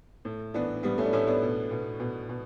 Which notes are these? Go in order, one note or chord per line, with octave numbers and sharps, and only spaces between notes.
A2
E3 B3 D4
A2 G3 B3
A3 C#4
D4
A2 C#4 E4
B3 D4
B2
B2
B2
B2